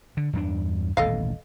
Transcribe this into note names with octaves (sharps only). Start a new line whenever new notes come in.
D3
E2 G2 D4
D#1 A1 B2 A4 D#5 F5